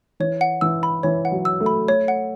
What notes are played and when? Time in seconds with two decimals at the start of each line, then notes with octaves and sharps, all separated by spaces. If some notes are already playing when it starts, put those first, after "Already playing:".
0.20 E3 C#5
0.41 F#5
0.61 E3 E6
0.83 B5
1.03 E3 C#5
1.25 F#5
1.32 F#3
1.45 E6
1.60 A3
1.66 B5
1.88 A3 C#5
2.08 F#5